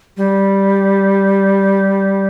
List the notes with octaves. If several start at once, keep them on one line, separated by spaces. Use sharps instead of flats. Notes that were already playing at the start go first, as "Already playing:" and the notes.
G3